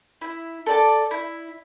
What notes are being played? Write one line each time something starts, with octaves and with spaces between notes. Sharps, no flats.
E4
A4 D5 A5
E4